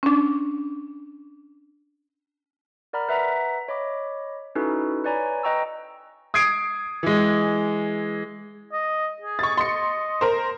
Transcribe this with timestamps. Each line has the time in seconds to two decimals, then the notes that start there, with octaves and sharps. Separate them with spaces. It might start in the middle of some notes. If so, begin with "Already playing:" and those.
0.03 C#4 D4
2.93 A#4 D5 F#5 A#5 B5 F6
3.09 B4 E5 F#5 A#5 B6
3.68 C#5 D#5 B5 D6
4.55 C#4 D#4 E4 F#4 A4 B4
5.04 B4 C#5 D5 G#5 A#5 B5
5.43 B4 D#5 G5 A#5 C#6 E6
6.34 D#6 G#6 C7 D7
7.03 E3 G#3
8.72 D#5
9.22 G#4
9.39 C#6 A6
9.57 D#5 C6 C#7
10.21 A#4 C5